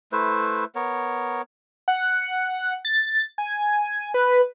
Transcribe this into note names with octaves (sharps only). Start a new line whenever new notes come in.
A3 E4 B4 C5
B3 A#4 C#5
F#5
A6
G#5
B4